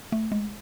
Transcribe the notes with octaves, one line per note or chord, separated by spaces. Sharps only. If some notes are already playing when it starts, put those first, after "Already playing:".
A3
G#3